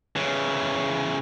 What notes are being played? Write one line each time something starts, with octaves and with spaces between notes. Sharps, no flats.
C#3 E3